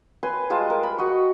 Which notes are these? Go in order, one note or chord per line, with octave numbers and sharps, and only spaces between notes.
B4 G#5 C6
G3 G#3 F4 A5
A#4
B5
F#4 D#5 C#6